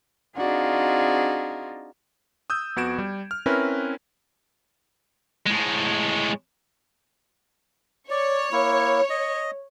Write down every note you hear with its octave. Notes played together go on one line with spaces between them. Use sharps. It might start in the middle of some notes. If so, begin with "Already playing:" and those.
C4 D4 D#4 F4 F#4 G#4
D#6 E6 G6
F2 B3 F#4 G#6 D7 E7
G3
F6
C4 C#4 E4 A#4 B4
A2 G#3
C#5 D5
A#3 E4
D#5